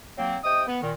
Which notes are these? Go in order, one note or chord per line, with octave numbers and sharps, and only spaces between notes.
F#3 A#3 C4
C3 D#5 G5 D#6
B3
A#2 D#3